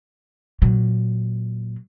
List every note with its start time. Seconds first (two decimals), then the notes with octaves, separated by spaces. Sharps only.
0.62 A#2 F#3